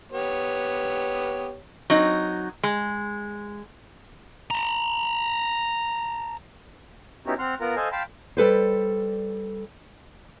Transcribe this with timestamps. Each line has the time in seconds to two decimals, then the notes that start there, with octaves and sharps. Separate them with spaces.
0.12 B3 G4 C#5
1.90 F#3 C4 D#4
2.63 G#3
4.51 A5 A#5
7.26 B3 C#4 D#4 E4 F#4 G4
7.39 C4 F#5 C6 F6
7.61 B3 F4 A#4 F#5 A#5
7.76 A4 C5 D#5 F5 G#5
7.92 F5 G5 A5 B5 C6
8.37 G3 A4 B4 C5